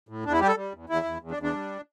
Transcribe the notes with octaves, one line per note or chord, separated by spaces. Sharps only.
A2
E2 D4
E4
G3 G4
A4
G3
E2
E2 E4
E2
E2
D4
E2
D4
G3